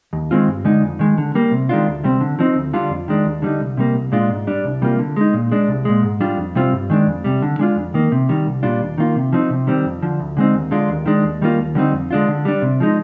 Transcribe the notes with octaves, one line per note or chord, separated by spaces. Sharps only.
D#2
D#3 G#3 C4 F4
G2
D3 G#3 D#4
F2
D#3 G#3
D3
G3 A#3
C3
D#3 G#3 D4 F4
D2
C3 G3 C4
D3
F3 C4 D#4
D2
D3 G3 D4 F4
F2
D#3 G#3 D4
D#2
D3 G3 C4 D#4
C2
C3 G3 A#3
C2
A#2 G#3 D4 F4
G#2
G3 D4
C2
C3 G3 A#3 F4
D3
G#3 D#4
A#2
G#3 D4
C2
A#2 G#3
G#2
G3 D4 F4
F2
C3 G3 C4 F4
G2
D#3 G#3 D4
F2
C3 G3
D3
G#3 D4 F4
F2
D#3 A#3
C3
D#3 G3
C2
A#2 G3 D4 F4
D#2
D#3 A#3 F4
C3
F3 C4 D#4
C3
D#3 G3 C4
F2
D3 F3
D2
D3 G#3 C4 D#4
D#2
D3 G#3 D4 F4
D#2
D#3 G#3 D4
D#2
D#3 G3 A#3 F4
D#2
D3 G3 C4 D#4
F2
D3 G#3 D4 F4
D3
G3 D4
C3
F3 G#3 D#4